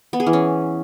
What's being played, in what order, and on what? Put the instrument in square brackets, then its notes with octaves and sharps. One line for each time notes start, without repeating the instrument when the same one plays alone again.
[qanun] B3
G#4
E3
C#4